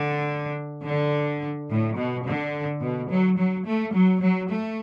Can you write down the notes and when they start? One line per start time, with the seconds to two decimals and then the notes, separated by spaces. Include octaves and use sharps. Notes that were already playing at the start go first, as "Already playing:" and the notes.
Already playing: D3
0.84 D3
1.69 A2
1.96 B2
2.25 D3
2.81 B2
3.09 F#3
3.37 F#3
3.66 A3
3.94 F#3
4.21 F#3
4.50 A3